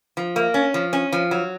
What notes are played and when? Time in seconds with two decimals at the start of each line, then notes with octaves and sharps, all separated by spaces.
0.17 F3
0.36 A#3
0.54 C#4
0.74 F3
0.93 C#4
1.12 F3
1.31 F#3